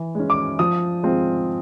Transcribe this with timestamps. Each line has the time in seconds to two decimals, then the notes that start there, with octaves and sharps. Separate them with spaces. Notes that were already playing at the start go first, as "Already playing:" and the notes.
Already playing: E3
0.15 G#3 C#4
0.30 D6
0.59 F3 D#6
1.03 G#3 C4 F4